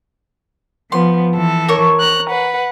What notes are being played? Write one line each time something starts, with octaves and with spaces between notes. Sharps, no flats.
F3 B3 C6
E3 A4
A#4 C#5 C#6
A#5 F#6
B4 F#5